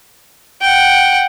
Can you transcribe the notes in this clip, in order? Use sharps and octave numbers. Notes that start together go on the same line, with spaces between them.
F#5 G5